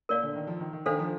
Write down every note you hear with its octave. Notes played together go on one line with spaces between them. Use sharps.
A#2 A#4 D5 F5
D3
D#3
F3
D#3
D#3
D#3 D4 A4 C5 F5
F3